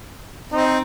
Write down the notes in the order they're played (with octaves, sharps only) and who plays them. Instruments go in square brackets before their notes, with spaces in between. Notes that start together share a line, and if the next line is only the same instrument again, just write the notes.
[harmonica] C4 [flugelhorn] D#4